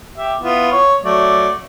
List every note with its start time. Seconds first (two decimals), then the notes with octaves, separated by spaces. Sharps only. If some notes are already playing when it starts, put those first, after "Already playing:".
0.17 G4 E5
0.41 B3 E4 F4
0.72 C#5
1.04 F#3 A3 D5